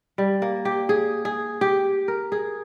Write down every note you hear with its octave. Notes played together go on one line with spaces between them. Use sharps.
G3
A#3
G4
G#4
G#4
G4
A#4
G#4